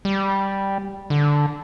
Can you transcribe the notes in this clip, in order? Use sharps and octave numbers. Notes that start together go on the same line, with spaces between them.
G3
D3